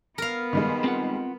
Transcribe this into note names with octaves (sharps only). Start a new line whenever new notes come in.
B3 A#4 F5
D#3 G3 G#3
C4 F4 F#5